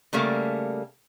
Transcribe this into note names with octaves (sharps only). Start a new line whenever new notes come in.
C#3 G3 A3 A#3